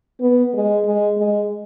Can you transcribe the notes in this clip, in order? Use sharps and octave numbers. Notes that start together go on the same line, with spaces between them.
B3
G#3
G#3
G#3